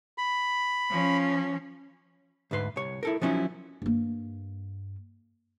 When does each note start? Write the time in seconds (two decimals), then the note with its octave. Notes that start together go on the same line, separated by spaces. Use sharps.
0.18 B5
0.90 F3 C#4
2.51 D2 G#2 B4 C6
2.76 C2 C#5
3.03 E4 A4 A#4
3.21 F3 F#3 C#4 D#4 E4
3.82 G2 A#3